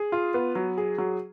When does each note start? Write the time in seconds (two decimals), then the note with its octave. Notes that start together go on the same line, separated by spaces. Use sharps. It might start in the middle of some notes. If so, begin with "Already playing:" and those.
Already playing: G#4
0.12 F4
0.34 B3
0.55 F#3
0.78 G#4
0.98 F#3